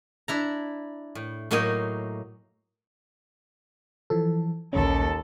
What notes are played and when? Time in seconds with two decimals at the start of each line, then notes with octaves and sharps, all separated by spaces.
0.28 D4 E4 A#5
1.15 A2
1.51 A2 F#3 A#3 D#4 D#5 G#5
4.10 E3 F3 A4
4.73 A#1 D#2 C#4 A4